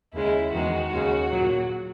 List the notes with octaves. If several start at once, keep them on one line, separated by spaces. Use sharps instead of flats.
D#2 C#3 G#3 E4
E2 D#3 G#3 F#4
D#2 C#3 G#3
A#2 F#3